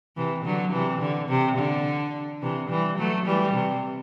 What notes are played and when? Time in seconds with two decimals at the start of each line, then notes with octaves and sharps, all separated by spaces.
0.17 C3 E3
0.45 D3 F#3
0.73 C3 E3
1.01 D3
1.29 C3
1.58 D3
2.41 C3 E3
2.70 E3 G3
2.98 F#3 A3
3.26 E3 G3
3.54 C3